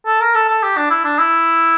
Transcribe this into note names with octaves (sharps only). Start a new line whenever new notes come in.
A4
A#4
A4
A4
G4
D4
E4
D4
E4